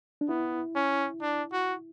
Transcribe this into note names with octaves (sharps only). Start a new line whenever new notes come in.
D4
B3 E4
C#4
D4
F#4